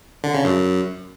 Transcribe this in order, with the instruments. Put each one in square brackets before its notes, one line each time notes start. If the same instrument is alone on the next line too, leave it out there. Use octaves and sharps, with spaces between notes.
[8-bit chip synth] D3
C#3
F#2